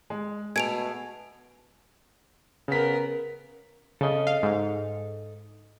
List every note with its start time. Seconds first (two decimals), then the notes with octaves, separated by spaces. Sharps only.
0.10 G#3
0.56 B2 A3 G#4 G#6 D7 F7
2.68 C#3 B3 A#4 B6
4.01 C#3 A4 D#5
4.27 F5
4.43 G#2